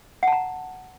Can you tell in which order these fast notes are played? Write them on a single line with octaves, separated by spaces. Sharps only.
F#5 A5 A#5